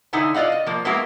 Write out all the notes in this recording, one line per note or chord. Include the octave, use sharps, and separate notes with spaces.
D3 D#4 E4 F#5 G#5
F4 D5 D#5 F5 F#5
D#5
F3 A#3
G#3 A#3 B3 E4 F#4 A#4